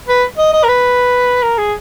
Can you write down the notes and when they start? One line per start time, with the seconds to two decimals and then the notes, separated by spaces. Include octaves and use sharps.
0.08 B4
0.38 D#5
0.53 D#5
0.64 A#4
0.68 B4
1.43 A#4
1.58 G#4